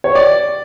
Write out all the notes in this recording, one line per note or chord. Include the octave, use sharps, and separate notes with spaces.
C#5
D5